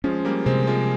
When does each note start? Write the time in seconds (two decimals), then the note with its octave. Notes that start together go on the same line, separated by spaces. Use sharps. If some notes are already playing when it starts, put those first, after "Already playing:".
0.04 F3 G#3 C#4
0.25 G3 A#3
0.46 C3 G#3 C4
0.67 F3 G#3